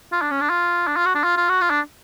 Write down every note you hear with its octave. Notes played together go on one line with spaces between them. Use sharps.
F4
D4
C#4
D4
F4
D4
F4
F#4
D4
F4
F4
F#4
F4
D4